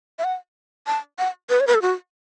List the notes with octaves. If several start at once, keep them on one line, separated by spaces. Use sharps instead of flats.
E5
F#5
A5
F#5
B4
C#5
B4
A4
F#4